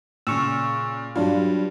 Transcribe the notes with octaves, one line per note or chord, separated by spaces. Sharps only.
A#2 C#3 C#6 E6
G2 F#3 D4 F4